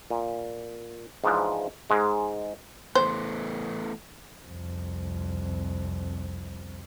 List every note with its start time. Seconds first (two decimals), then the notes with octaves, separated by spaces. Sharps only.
0.10 A#2
1.24 G#2 E3 F3 D4
1.90 G#2 G#3
2.95 E3 A3 B3 C5
4.45 C2 F2